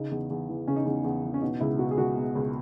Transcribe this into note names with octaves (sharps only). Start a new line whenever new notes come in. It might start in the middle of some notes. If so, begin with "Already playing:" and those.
Already playing: C#3 D#4
E2
E2
E3
C#3 C#4
D#4
E2 C#4
E2
E3
C#4
B2 D#4
C#2 E4
B2 F#4
G#4
C#2 F#4
B2
C#2